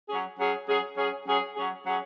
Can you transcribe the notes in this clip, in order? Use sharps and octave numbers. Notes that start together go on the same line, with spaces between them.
F#3 C#4 G#4
F#3 C#4 G#4
F#3 C#4 G#4
F#3 C#4 G#4
F#3 C#4 G#4
F#3 C#4 G#4
F#3 C#4 G#4